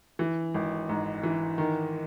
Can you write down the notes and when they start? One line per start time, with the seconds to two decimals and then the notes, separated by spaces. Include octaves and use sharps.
0.19 E3
0.54 G#1
0.89 G#2
1.23 E3
1.58 D#3